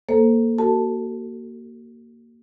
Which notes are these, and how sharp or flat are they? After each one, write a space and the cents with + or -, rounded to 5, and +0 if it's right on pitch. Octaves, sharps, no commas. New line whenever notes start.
A#3 +0 A4 +0 C5 +0
F#4 +30 A4 +35 A5 +0